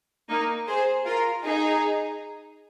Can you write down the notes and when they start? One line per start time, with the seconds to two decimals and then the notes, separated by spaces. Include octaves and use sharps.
0.29 A#3 D#4
0.67 G#4 C5
1.06 F4 A#4
1.44 D#4 G#4